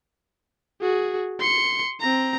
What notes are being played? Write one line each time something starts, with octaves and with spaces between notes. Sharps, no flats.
F#4 G#4
C6 C#7
C4 A#5